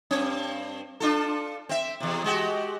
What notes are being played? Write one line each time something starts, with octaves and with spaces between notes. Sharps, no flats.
G2 C4
D4 F4 A4
C4 E5
E2 C3
G#3 F#4 G4